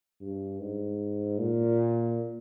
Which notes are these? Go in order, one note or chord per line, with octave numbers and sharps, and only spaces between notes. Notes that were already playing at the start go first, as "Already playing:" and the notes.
G2
G#2
A#2